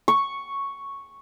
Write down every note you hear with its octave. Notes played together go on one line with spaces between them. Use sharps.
C#6